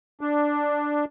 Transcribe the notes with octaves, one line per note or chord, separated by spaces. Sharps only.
D4